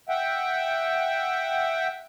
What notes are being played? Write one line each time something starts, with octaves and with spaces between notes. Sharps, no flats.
E5 F#5 G5